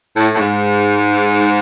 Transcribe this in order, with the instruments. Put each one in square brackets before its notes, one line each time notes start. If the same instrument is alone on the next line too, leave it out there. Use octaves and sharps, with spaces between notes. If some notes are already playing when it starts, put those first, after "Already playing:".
[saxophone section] A2
A2
G#2